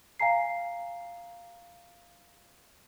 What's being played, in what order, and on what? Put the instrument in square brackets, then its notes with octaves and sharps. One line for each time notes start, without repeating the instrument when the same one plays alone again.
[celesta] F5 G#5 A#5 C7